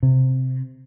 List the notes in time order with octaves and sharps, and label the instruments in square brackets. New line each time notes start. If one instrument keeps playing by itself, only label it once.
[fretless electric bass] C3